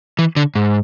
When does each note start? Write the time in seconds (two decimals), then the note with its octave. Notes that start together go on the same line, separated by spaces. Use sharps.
0.19 E3
0.36 D3
0.55 G#2